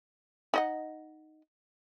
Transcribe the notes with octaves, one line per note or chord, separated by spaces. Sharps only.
D#4 D#5 F#5